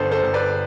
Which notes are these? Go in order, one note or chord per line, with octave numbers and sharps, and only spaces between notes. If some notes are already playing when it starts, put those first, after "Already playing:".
Already playing: G1 D3 A4 C5
A4 C5
G1
B4 D5